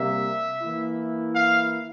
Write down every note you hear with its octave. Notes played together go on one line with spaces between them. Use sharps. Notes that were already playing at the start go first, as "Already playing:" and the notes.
Already playing: C3 G3 A#3 E5
E3 A#3 E4
F5